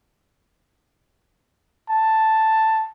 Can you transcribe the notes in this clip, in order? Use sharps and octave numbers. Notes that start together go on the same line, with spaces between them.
A5